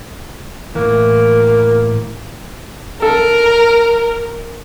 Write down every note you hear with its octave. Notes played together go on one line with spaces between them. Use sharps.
A2 E3 A#3
A4 A#4